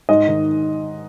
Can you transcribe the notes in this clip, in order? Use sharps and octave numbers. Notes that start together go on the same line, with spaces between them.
G#2 D#5
D#3